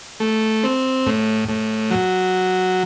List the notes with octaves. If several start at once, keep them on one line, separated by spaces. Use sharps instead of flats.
A3
C4
A2
A2
F#3